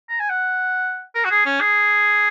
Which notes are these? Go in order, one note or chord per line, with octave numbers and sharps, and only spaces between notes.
A#5
G#5
F#5
A#4
F#4
G#4
C#4
G#4